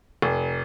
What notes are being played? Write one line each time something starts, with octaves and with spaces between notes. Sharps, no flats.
F1